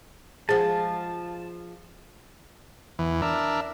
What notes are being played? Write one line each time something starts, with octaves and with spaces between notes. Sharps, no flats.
F3 G#3 G#4 C5 F#5 A5
E2 E3
D4 A#4 E5